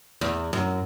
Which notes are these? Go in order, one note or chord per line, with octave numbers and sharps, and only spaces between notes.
E2
F#2